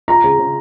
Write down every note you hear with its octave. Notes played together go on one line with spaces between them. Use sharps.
F4 A#5
C#3
C#3